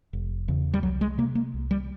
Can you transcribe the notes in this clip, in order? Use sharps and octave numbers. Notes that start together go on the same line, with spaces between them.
F1
E2 C#3
G3
C2 F#3
G#3
C3 A#3
A#3
C2
G3